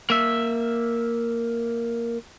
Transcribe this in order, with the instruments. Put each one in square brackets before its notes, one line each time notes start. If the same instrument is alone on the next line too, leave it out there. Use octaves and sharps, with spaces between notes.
[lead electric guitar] A#3 E5